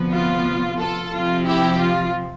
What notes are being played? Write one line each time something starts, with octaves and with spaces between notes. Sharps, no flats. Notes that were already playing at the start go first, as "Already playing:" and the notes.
Already playing: D2 C3 F3 B3
F4
F4 A4
C3 F3 C4 F4
E4 G4
F4